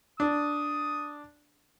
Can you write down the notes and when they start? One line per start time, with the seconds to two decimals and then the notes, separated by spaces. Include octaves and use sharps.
0.20 D4 D#6